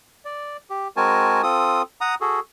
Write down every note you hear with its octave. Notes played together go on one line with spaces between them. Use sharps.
D5
G4
G#3 C4 F#4 A#4 G#5 A5
C4 F4 A4 D#6
F#5 A#5 D#6
F#4 G#4 A4